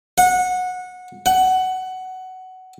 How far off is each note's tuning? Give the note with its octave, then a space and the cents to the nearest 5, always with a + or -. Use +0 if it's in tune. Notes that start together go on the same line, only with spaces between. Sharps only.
F#5 -20
F#5 +15